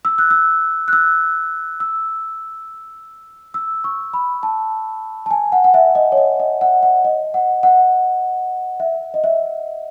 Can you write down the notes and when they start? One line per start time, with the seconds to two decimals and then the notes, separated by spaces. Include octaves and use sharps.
0.05 E6
0.18 F#6
0.31 E6
0.88 F#6
0.93 E6
1.80 E6
3.54 E6
3.84 C#6
4.13 B5
4.43 A5
5.26 A5
5.31 G#5
5.52 F#5
5.64 F#5
5.74 E5
5.95 D#5
6.12 C#5
6.17 D#5
6.40 D#5
6.61 F#5
6.83 F#5
7.05 D#5
7.34 F#5
7.63 F#5
8.80 E5
9.14 D#5
9.24 E5